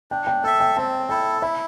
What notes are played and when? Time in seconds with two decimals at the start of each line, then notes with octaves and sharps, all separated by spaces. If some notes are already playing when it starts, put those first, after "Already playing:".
0.11 D4 G5
0.27 G5
0.44 A4 G5
0.47 E5
0.60 G5
0.77 C4 A5
1.09 E4 A4 G5
1.42 E4 E5